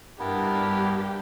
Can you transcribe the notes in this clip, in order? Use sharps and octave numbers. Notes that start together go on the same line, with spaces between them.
G2 B3 D4 E4 G4 A#4